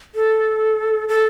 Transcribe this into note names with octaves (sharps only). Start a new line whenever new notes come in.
A4
A4